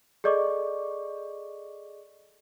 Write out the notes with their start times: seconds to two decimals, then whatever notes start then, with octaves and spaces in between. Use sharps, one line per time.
0.24 G#4 A4 D5 D#5 C#6 D6